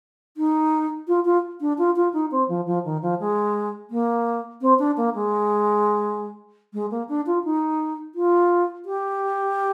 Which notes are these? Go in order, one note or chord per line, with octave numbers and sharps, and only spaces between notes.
D#4
F4
F4
D4
F4
F4
D#4
C4
F3
F3
D#3
F3
G#3
A#3
C4
D4
A#3
G#3
G#3
A#3
D4
F4
D#4
F4
G4